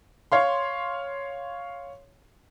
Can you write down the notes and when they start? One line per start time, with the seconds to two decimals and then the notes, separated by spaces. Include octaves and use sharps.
0.32 C#5 F5 C6